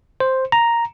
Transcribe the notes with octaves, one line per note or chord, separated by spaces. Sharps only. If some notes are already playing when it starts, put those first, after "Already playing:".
C5
A#5